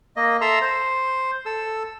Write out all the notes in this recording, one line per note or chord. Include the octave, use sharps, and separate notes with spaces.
A#3 D#5
A4 E5 A#5 C6 E6
C5
A4 E6